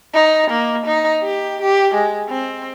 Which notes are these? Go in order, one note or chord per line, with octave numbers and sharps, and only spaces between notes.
D#4
A#3
D#4
G4
G4
G#3
C4